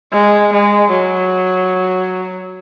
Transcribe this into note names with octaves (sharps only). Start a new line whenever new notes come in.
G#3
G#3
F#3